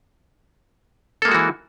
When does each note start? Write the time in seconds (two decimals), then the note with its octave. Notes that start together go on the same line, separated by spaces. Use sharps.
1.22 A4
1.25 A#3
1.28 G#3
1.31 F#4
1.35 E3